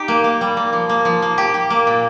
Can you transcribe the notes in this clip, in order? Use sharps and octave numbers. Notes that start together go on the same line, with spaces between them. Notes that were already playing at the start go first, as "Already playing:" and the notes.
Already playing: D#4 G4
A#3
A#3
G3
A#3
F3
A#3
F3
A#3
G4
G4
A#3
A#2